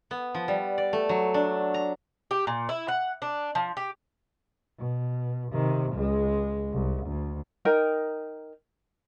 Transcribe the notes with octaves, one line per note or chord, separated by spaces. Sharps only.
B3
F3
G3
D5
A3
F#3
D4
A#5
G4
A#2
E4
F#5
D4
F3
G4
B2
C3 D#3
C#2 G#3
C2
D2
D#4 A#4 G5